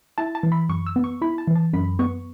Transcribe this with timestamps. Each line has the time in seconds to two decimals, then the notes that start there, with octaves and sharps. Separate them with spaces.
0.18 E4 A5
0.35 A5
0.43 E3
0.52 B5
0.69 F#2 C#6
0.87 E6
0.96 B3
1.04 C#6
1.22 E4 B5
1.38 A5
1.47 E3
1.56 A5
1.73 F#2 B5
1.99 B3 C#6